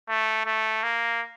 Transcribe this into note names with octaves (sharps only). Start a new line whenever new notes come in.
A3
A3
A#3